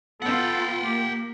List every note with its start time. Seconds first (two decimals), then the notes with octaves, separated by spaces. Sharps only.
0.22 B3 F4 A4 F#5 G5
0.85 A#3 G4